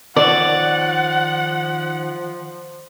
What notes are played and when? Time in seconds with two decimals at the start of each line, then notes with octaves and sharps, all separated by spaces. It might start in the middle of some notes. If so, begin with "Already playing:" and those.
0.16 D#3 F3 C#5 D5 E5 F#5